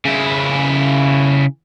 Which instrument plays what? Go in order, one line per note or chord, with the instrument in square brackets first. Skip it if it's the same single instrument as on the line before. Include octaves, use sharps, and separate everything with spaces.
[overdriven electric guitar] C#3 E4